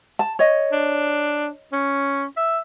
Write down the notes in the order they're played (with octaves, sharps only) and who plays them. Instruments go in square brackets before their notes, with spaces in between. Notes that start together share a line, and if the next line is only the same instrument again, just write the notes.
[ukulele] A5
C#5 D#5
[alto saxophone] D4
C#4
E5